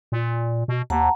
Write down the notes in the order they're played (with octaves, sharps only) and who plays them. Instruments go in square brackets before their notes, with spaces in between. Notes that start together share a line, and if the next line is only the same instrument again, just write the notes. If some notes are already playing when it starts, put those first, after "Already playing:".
[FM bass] A#2
B2
[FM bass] D#2 [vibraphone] F#5 A5 A#5